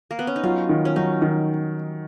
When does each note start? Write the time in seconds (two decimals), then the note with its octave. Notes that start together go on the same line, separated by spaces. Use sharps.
0.11 A#3
0.19 B3
0.27 C#4
0.36 D#4
0.43 F#3 F4
0.69 D#3
0.85 C#4
0.96 F#3 D#4
1.22 D#3